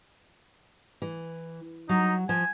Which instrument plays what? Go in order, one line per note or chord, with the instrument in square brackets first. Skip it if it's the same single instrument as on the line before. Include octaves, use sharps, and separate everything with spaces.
[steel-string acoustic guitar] E3
[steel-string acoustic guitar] F#3 [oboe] D#4
[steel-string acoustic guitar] F3 [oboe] G#5